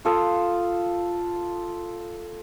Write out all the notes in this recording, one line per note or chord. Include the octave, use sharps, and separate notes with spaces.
F4 A4 D#6